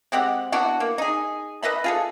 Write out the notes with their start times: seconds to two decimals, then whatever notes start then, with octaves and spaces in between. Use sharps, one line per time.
0.12 G#3 C4 G4 F#5
0.52 B3 D4 E4 F#4
0.80 A#3
0.98 D#4 G#4
1.62 B4 D#5 E5 B5
1.84 F4 G#4 A4